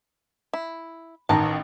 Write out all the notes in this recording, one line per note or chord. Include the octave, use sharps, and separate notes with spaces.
E4
A1 D#3 A5 A#5